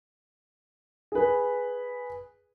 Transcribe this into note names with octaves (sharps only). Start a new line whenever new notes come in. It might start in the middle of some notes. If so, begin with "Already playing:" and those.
G#4 B4